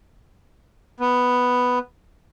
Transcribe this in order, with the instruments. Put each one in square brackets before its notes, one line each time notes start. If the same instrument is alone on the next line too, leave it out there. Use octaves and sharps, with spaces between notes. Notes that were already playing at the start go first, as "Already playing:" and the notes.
[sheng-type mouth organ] B3